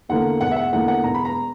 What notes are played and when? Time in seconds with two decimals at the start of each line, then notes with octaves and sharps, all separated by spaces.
0.09 E2 D3 A#3 F#5
0.41 E1 F#5
0.51 E5
0.56 F#5
0.72 E2 D3 A#3 F#5
0.88 F#5
1.04 E1 A#5
1.15 B5
1.25 A#5